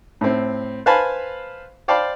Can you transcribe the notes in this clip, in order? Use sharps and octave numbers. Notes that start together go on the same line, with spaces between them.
A2 C4
B4 C5 F5 G#5 A5 B5
C5 D5 F5 G5 A5 B5